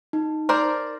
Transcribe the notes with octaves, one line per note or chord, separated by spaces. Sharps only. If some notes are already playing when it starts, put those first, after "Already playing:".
D#4
A#4 C5 D5